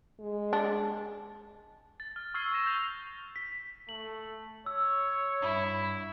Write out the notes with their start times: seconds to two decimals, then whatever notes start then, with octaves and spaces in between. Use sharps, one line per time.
0.19 G#3
0.53 D4
2.00 A6
2.16 F6
2.34 C#6 E6 F6 G#6 C7 G7
2.51 C#6 E6 F6 A#6 E7 G7
2.66 G6 F7
3.36 B6
3.89 A3 F#7
4.66 C#5 E6
5.42 G2 E4